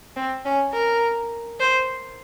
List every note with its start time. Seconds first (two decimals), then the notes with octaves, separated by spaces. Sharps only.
0.16 C4
0.45 C#4
0.73 A#4
1.60 C5